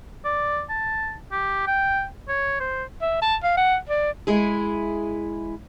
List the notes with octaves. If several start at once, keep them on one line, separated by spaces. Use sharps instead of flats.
D5
A5
G4
G5
C#5
C5
E5
A5
F5
F#5
D5
G#3 E4 G#4